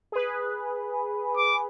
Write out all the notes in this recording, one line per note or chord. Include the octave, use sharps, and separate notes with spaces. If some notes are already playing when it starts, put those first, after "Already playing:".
G#4 B4
D6